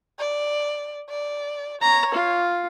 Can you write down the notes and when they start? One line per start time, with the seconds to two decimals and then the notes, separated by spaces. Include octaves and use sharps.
0.19 D5
1.10 D5
1.82 C#5 A#5
2.14 F4